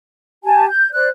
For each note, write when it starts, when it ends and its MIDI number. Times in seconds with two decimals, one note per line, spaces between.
0.44 0.67 67
0.44 0.67 80
0.44 0.67 81
0.69 0.90 91
0.93 1.08 72
0.93 1.08 74
0.93 1.08 90